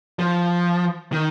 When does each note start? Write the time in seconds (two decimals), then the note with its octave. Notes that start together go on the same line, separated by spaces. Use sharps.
0.19 F3
1.12 D#3